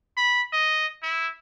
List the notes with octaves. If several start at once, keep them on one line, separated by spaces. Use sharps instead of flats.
B5
D#5
E4